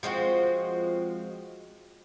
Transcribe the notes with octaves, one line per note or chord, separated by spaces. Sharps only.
F3 G#3 C4 F#4